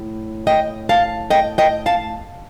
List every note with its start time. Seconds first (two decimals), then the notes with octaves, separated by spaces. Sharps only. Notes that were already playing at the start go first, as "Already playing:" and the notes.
Already playing: A2
0.47 D#5 G5
0.89 F5 A5
1.30 D#5 G5
1.58 D#5 G5
1.86 F5 A5